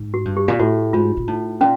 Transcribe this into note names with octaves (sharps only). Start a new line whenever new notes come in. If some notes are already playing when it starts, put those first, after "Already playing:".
Already playing: G#2
F#4
G2
G4
A#2
A2 F#4
G#2 F4
A#2
A2 D#4
A#2 C#4